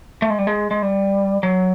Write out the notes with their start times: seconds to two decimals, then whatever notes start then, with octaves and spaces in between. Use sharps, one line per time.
0.22 A3
0.30 G#3
0.38 G3
0.47 G#3
0.71 G#3
0.82 G3
1.43 F#3